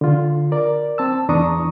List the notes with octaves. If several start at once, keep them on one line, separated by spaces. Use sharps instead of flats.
D3 F4
A#4 D5
C4 A5 E6
E2 D4 A#5 C#6 D#6